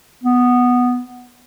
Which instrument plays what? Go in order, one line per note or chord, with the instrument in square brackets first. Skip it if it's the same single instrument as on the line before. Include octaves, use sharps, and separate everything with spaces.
[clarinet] B3